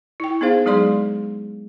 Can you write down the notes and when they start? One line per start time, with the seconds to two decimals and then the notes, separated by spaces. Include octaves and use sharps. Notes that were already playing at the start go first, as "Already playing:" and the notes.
0.20 E4 G5
0.41 B3 D#4 G#4 C5 F5
0.66 F#3 G#3 G#4 D5 C6